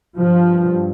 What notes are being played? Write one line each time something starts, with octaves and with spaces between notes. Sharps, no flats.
G2 F3